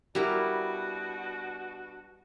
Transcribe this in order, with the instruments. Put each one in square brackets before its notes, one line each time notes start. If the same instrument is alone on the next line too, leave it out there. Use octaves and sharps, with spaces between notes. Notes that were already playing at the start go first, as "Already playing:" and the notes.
[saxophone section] B2 D4 F#4 [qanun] G3 E4 A#4